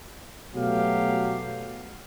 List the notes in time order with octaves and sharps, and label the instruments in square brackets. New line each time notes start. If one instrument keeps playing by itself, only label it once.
[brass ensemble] B2 F#3 A3 G4 F5